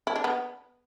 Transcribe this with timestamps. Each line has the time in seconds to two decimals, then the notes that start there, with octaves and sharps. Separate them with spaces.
0.07 E4
0.16 D4
0.24 B3